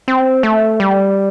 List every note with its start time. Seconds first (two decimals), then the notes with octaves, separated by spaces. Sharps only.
0.08 C4
0.43 A3
0.80 G3